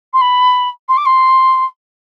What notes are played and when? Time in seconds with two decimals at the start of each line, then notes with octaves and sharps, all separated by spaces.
0.13 C6
0.21 B5
0.89 C6
0.97 D6
1.06 C6